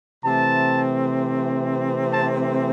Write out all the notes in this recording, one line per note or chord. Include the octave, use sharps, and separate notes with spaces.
C3 E3 A3 C4 A5
A5